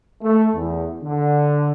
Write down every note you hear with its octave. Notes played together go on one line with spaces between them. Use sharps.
A3
E2
D3